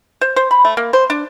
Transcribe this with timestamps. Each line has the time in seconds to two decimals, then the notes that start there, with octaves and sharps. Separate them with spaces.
0.21 C5
0.36 C5
0.51 B5
0.65 A3
0.77 A#3
0.93 C5
1.10 D4